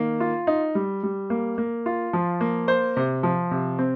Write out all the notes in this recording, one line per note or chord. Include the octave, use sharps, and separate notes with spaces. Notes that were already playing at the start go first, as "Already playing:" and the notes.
Already playing: D#3 A#3
F4
D#4
G3
G3
A#3
A#3
F4
F3
A#3
C5
C3
F3
C3
C4